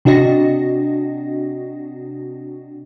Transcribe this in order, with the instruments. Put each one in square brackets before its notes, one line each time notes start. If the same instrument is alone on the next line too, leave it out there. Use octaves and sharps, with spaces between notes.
[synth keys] C3 D4 F#4 D#5 A#6